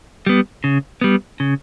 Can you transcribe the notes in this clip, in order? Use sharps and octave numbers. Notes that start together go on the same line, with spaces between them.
G3 B3
C#3
G3 B3
C#3